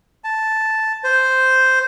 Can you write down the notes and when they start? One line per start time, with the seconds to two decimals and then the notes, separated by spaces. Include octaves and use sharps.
0.24 A5
1.04 C5